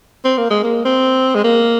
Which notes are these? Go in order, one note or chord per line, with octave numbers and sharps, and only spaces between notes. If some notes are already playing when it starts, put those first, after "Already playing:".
C4
A#3
G#3
A#3
C4
G#3
A#3